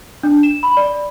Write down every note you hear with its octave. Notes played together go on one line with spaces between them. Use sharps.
D4
E7
B5
D5